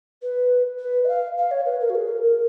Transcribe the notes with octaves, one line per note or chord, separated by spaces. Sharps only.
B4
B4
D#5
F5
F5
C#5
B4
A#4
F#4
G#4
A#4
A#4